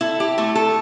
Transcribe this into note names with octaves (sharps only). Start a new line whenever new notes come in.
E4 A4
G4
A3 A4
A4